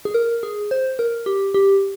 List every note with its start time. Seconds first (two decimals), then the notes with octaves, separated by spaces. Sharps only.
0.05 G#4
0.14 A#4
0.43 G#4
0.71 C5
0.99 A#4
1.26 G4
1.54 G4